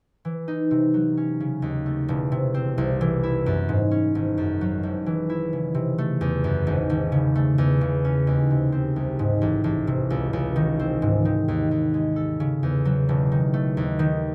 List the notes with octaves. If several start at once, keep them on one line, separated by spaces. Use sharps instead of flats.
E3
D#4
C3
F#3
C#4
C#3
D#2
A3
E1
C3
C4
C2
E3
E4
F#2
G#2
C#4
G#1
F#2
F#3
G#1
E3
E4
C#3
C3
A3
E2
F#2
G#1
G#1
C#3
A3
E2
C#3
C#4
D#2
C3
C4
C2
G#2
A1
A1
C3
C#2
C#2
D#3
C4
G#2
D#3
D#2
D#2
G#3
A4
C#3
E2
F#3
E1
D#3
A3
D#2
D#3